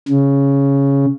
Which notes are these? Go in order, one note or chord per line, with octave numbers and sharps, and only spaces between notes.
C#3